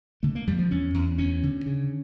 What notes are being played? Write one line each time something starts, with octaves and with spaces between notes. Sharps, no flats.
D3 A3
A#3
F2 G3
F3
E2 C#4
E2
D2 C#4
D3
C#3